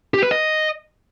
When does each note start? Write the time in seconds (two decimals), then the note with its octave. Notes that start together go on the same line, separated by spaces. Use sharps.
0.14 G4
0.22 B4
0.31 D#5